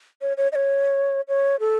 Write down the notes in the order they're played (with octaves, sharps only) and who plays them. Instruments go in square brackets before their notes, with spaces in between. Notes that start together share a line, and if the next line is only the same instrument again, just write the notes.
[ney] C#5
C#5
D#5
C#5
C#5
A4